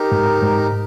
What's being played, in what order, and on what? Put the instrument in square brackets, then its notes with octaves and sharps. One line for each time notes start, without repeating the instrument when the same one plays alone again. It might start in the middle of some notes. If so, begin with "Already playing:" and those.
Already playing: [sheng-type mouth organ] D#4 G4 A#4
[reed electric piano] G#2
G#2